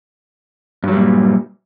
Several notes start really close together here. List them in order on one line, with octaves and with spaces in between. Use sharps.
G2 F#3 G3 A#2